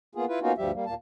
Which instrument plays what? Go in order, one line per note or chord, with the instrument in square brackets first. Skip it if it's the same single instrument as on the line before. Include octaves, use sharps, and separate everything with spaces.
[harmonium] A#3 B3 F4 G#4
E4 F4 B4
A#3 B3 C#4 D#4 F4 F#4
D2 G2 F3 G3 G4 E5
G3 A#3
D#2 A#2 A#3 A5